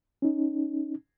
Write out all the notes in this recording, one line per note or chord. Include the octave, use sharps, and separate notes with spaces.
C#4 D#4